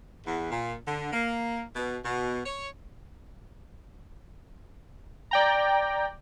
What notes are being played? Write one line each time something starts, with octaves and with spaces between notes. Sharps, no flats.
E2
A#2
D3
A#3
B2
B2
C#5
D5 G5 A#5